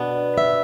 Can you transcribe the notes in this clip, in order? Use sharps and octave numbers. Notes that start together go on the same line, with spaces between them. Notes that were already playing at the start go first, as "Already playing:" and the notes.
Already playing: B2 B3 D4
E5